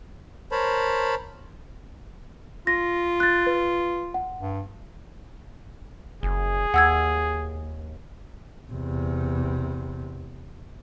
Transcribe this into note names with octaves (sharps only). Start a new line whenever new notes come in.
A#4 C5 C#5 A5 B5
F4 A#6
F#6 A6
B4
F#5
G2
F#1 G#4
D#2 F#5 E6 G#6
E2 C3